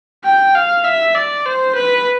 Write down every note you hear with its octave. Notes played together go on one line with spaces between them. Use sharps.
G5
F5
E5
D5
C5
B4